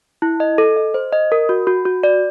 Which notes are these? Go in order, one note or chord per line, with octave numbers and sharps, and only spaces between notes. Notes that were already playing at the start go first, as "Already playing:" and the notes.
E4
D#5
A4
D#5
C5
D#5
A#4
F#4
F#4
F#4
D5